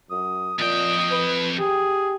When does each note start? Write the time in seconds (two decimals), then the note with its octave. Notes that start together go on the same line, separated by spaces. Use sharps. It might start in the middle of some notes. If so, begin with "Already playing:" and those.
0.10 F#2 D#6
0.59 F2 A#2 D#5 G5
1.12 B4
1.59 G4 G#4